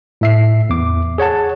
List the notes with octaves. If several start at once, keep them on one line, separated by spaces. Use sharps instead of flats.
A2 E5 C7
E2 D6
G#4 C#5 F#5 A5